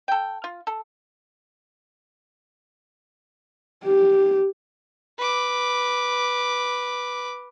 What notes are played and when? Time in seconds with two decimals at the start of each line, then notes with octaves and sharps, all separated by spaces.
0.08 A4 G5
0.44 F4
0.67 A4
3.84 G4
5.19 B4 D6